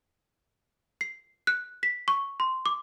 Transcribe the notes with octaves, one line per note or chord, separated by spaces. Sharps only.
C7
F#6
B6
C#6
C6
D6